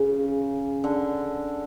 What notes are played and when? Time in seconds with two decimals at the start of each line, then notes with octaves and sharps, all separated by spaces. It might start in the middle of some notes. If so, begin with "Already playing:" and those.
Already playing: C#3
0.84 D3